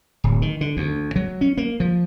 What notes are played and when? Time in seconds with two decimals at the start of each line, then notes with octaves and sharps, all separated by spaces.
0.24 D1
0.42 D#3
0.61 D3
0.77 D2
1.16 F#3
1.41 C#4
1.57 A#3
1.80 F3